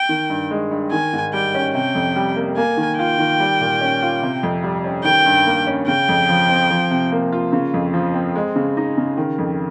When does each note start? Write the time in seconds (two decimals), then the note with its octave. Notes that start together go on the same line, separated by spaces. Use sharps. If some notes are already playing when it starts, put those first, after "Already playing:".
Already playing: G5
0.09 D#3
0.30 G2
0.51 G#3
0.71 G2
0.92 D#3 G#5
1.13 G#2
1.33 G3 G5
1.55 C#4
1.74 C3 G5
1.95 F2
2.16 G3
2.36 A#3
2.57 A#3 G#5
2.77 D#3
2.98 F4 G5
3.18 D#3
3.40 G3
3.61 A#2
3.81 C#4
4.02 F4
4.23 C3
4.43 F2
4.64 G3
4.84 C#4
5.04 D#3 G5
5.26 G2
5.46 A#3
5.67 C#4
5.88 C#3 G5
6.09 F2
6.29 F3
6.49 C4
6.70 F3
6.91 C3
7.12 A#3
7.32 F4
7.53 C#3
7.74 F2
7.94 F3
8.14 C4
8.36 G#3
8.55 C#3
8.77 D#4
8.97 C#3
9.17 D#3
9.39 F2